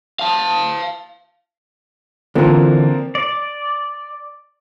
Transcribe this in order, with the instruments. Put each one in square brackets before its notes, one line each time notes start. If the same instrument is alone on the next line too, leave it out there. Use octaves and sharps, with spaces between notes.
[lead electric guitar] F5 A5
[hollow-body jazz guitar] D3 E3 [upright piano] F3 A#3 C4
[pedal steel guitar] D5